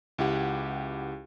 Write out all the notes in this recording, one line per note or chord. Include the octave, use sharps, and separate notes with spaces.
C#2 E4 G4 F#5